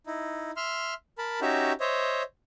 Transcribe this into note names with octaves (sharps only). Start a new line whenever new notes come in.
D#4 E4
E5 C6 F6
A#4 A5 B5
C#4 D#4 F#4 G4 E5
C5 C#5 D#5 E5